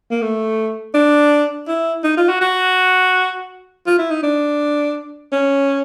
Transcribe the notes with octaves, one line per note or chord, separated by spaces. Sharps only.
A#3
A3
D4
E4
D#4
F4
F#4
F#4
F4
E4
D#4
D4
C#4